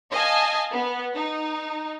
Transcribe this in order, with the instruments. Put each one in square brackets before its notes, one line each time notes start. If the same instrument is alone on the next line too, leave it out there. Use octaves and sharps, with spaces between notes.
[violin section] D#5 F5 G#5 A5
B3
D#4